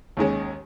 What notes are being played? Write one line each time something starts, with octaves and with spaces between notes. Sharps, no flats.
D#2 D#3 G#3 C#4